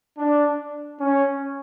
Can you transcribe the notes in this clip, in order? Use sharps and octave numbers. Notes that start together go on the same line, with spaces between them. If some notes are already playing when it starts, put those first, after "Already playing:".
D4
C#4